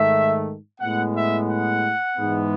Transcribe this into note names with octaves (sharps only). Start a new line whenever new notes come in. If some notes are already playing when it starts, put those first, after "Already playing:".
Already playing: G#2 D#3 A3 E5
A2 G#3 B3 F#5
E5
F#5
G#2 E3 G#3 B3